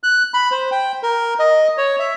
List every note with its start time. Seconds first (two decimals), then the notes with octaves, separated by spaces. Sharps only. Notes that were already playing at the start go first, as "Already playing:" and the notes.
0.03 F#6
0.34 B5
0.51 C5
0.71 G5
1.03 A#4
1.39 D#5
1.78 C#5
1.99 E5